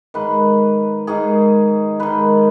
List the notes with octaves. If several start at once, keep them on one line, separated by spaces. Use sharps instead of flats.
G#2 D#3 B4
G#2 D#3 G#4
G#2 D#3 B4